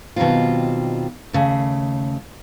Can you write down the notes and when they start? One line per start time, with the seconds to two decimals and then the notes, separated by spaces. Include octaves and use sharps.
0.16 B2 D#3 F#3 G3 C4 F4
1.33 D#2 C#3 A3